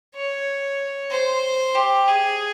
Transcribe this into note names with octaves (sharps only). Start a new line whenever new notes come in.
C#5
C5
G4
G#4